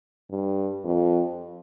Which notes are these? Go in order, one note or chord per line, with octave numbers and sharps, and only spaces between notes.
G2
F2